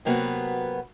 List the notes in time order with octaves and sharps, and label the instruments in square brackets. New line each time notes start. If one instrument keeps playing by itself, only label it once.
[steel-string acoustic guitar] C3 F#3 A#3 B3 F#4 B4